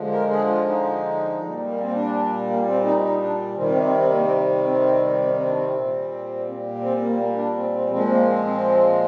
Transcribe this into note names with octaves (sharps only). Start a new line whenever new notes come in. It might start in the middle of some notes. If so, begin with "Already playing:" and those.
Already playing: D3 F3 G#3
A#4
G#4
F4
D#4
A#2 G3
A#3
C4
D4
A#3
C4
D#4
D#4
D4
C3 D#3 G3 C4
C4
C4
C4
A#3
C4
C4
C4
C4
C4
D4
C4
A#2 G3
C4
A#3
A#3
D4
C4
C4
A#2 F3 G#3 C4
A#3
C4
C4